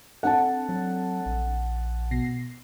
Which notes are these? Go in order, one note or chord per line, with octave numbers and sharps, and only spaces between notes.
C4 D4 A4 F#5 A5
F#3
A#1
B2 A#6 C7